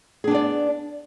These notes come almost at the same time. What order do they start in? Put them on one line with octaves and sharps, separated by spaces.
G#4 D4 B3 D5